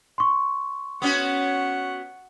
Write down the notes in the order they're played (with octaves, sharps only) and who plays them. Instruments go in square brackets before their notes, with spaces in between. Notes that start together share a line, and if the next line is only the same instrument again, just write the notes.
[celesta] C6 C#6
[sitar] B3 C#4 F#4 [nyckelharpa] F#5